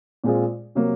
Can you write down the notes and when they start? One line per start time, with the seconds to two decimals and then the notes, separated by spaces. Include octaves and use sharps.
0.24 A#2 G#3 C4 F4 G#4
0.75 C3 F#3 A#3